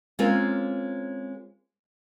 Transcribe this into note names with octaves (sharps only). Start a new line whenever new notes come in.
G#3 A#3 C4 C#4 F4